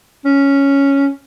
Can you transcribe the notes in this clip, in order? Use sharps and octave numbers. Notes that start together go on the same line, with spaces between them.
C#4